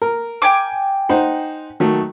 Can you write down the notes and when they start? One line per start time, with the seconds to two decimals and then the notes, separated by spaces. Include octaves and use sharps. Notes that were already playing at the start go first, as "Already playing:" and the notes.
0.02 A#4
0.42 G5 G#5 D6
1.09 D#4 C5 F#5
1.80 D#3 F#3 A3